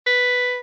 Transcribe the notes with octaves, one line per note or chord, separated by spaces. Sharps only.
B4